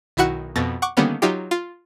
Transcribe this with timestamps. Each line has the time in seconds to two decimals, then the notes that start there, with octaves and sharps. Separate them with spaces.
0.17 B1 D#3 E4 F#4 F#5 F#6
0.56 F2 B2 A6 A#6
0.82 F#5 C#6 D6
0.97 D3 D#3 G3 A#3 B3 C#4
1.22 F#3 D#4 F4 G4
1.51 F4